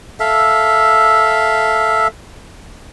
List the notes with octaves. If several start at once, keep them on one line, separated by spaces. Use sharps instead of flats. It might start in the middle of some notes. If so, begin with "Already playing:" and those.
A4 E5 F5